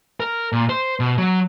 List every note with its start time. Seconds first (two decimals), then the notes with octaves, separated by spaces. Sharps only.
0.20 A#4
0.52 A#2
0.69 C5
1.00 B2
1.18 F#3